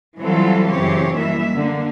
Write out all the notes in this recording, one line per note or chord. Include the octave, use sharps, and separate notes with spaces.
E3 F#3 G3 C4 F4 A4
F#2 C#3 E3 C4 G4 C#5
D#3 E3 G3 A#3 E5
D3 A#3